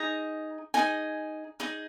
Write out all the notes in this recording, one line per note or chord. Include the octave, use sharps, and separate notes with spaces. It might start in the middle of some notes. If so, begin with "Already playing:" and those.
Already playing: D#4 G#4 D#5 A#5
D#4 G#4 D#5 G#5
D#4 G#4 D#5